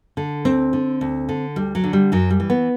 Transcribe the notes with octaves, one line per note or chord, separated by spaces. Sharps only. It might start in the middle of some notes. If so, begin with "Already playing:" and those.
D3
D2 C4
D3
D2
D3
D2 G3
F#3
D3
G3
F#2 F#3
G3
E3
B3